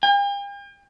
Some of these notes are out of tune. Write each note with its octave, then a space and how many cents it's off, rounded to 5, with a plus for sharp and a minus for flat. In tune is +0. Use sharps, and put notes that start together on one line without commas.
G5 +45